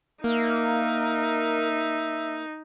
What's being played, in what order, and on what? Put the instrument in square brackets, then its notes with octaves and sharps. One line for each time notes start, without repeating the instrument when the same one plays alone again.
[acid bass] A#3 [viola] D#4 [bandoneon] A#4 [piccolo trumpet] E5